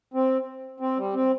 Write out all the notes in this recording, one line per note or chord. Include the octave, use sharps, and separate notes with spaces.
C4
C4
G3
C4